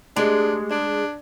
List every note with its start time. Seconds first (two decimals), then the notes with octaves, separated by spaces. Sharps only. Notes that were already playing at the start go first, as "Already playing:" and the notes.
0.16 G#3 A3 D4 G4 G#4
0.71 D4 D5